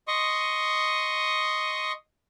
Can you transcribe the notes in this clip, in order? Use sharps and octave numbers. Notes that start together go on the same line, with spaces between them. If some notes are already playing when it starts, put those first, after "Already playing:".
D#5 C6 C#6 D#6